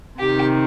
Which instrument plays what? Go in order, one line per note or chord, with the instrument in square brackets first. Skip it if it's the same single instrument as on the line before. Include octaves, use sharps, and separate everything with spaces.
[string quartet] C3 D#3 G4